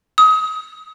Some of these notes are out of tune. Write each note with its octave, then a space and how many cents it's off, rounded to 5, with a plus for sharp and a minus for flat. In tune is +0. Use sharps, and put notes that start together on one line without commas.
D#6 +30